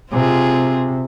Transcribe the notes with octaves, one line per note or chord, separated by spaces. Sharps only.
C3 C4 F4 G#4